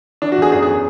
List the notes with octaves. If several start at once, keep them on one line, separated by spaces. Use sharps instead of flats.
E3 D4
F#4
E2 G#4
F#2 G#4
G#4